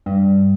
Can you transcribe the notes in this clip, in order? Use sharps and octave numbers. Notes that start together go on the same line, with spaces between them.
G2